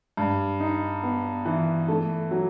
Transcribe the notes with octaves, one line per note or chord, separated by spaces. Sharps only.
G2
D#4
B3
E3
A3
F#3